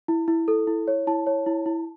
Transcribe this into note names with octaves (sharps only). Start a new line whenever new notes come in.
E4
E4
A4
E4
C#5
E4 A5
C#5
E4
E4